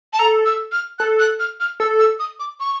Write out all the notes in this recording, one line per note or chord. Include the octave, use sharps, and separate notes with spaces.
A5
A4 A#5
E6
F6
A4 F#6
F#6
F6
F6
A4 E6
E6
D#6
D6
C#6